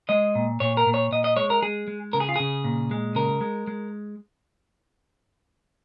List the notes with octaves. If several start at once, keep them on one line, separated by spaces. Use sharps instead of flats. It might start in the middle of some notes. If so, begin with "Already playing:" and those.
G#3 D#5
A#2
A#2 C#5
A#4
A#2
C#5
A#2 D#5
D#5
G#3 C#5
A#4
G#3 G#4
G#3
C#3 A#4
G#4
F4
C#3 G#4
A#2
G#3
C#3 A#4
G#3
G#3